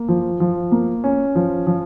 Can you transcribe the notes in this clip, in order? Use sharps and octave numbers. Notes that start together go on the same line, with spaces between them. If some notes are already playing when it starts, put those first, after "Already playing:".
Already playing: A#3
F3
F3
A#3
C#4
F3
F3